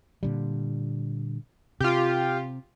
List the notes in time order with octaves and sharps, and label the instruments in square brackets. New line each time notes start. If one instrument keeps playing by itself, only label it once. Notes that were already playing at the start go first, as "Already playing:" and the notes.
[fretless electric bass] A#2 D3 G3
[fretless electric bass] C3 [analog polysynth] F4 G4